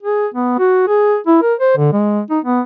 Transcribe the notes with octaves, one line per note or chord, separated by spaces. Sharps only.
G#4
B3
F#4
G#4
E4
A#4
C5
D3
G#3
D#4
B3